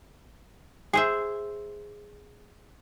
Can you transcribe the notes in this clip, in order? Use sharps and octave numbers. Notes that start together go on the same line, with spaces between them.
G#4 C5 E5